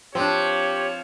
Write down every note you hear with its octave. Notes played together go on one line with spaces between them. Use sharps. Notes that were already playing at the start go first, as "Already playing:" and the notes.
F3 C4 D4 G4 C#5